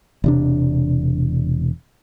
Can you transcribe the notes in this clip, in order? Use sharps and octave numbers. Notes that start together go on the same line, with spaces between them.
E1 C3 D4